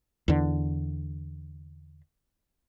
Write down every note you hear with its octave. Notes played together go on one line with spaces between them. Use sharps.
E2 D3